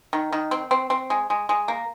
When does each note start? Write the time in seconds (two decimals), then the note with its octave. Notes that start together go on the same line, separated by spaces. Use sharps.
0.13 D#3
0.32 D#3
0.51 C4
0.71 C4
0.90 C4
1.10 G#3
1.30 G#3
1.49 G#3
1.68 A#3